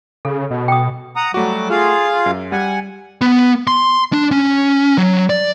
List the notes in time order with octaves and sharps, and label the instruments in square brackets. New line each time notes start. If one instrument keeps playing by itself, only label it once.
[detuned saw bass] C#3 [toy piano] A4
[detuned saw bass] B2
[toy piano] G5 D#6
[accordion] F#5 A#5 D#6
[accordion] F#3 G3 D6 [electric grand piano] A3 F#4
[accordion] F4 G#4 F5
[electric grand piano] F#2
[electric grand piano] G3 [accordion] F#5 G#5
[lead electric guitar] B3
C6
D4
C#4
F#3
D5